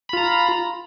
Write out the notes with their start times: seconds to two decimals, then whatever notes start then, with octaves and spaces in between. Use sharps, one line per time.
0.09 B5
0.13 F4
0.17 A#5